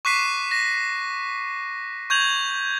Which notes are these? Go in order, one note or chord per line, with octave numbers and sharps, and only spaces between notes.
C#6 D6 F#6 B6 C7 D#7
A#6
C#6 G6 G#6 F7 F#7